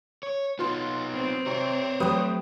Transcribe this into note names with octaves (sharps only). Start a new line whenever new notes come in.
C#5
B3 D#4 F4 C6
C4
C3 C5 C#5
F#3 A3 G4 B4 D#6